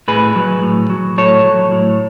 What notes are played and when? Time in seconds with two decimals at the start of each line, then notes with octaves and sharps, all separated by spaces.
0.08 A2 G#4 B4
0.36 F#3
0.62 A2
0.90 F#3
1.17 A2 A4 C#5
1.44 F#3
1.72 A2